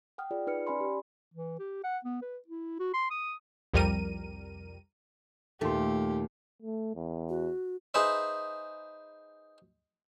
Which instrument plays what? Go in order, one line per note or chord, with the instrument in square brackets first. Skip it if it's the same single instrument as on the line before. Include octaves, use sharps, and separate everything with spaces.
[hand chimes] F#5 G5 D#6 F6
F4 G#4 D5
D#4 B4 F6 C#7
C#4 D5 G#5 B5 C6
G4
[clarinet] E3
G4
F#5
B3
B4
E4
F#4
C6
D#6
[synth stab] C2 F2 G3 A#4 D#7
[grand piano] D#2 A#2 C6 [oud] A3 [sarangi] G4
[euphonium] A3
E2
[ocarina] F#4
[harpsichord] D#4 G#4 B4 C5 E5